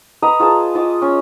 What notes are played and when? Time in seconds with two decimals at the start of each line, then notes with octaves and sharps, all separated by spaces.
0.22 B4 D#5 A#5
0.40 F4 G#4 B4 A5
0.75 F4 D#5 D6
1.02 C#4